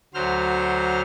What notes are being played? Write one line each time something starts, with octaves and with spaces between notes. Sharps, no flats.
D2 F#3 C5 F6